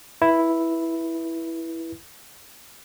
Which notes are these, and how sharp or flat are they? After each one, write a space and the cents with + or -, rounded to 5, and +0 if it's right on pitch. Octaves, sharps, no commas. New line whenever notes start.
E4 +0 B4 -20